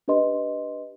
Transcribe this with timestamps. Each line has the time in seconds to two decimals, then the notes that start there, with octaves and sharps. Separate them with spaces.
0.08 D4 G4 B4 D#5 C6